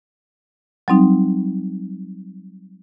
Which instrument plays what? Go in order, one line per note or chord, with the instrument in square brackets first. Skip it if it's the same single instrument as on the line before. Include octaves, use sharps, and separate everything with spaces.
[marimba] F#3 G3 C4 D#4